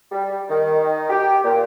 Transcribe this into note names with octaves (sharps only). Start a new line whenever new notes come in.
G3
D#3
G4
A#2